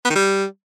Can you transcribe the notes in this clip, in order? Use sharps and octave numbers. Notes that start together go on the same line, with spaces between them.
B3
D#3
G3